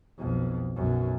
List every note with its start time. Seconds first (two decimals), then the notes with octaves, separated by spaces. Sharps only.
0.18 B1 F2
0.76 B1 F#2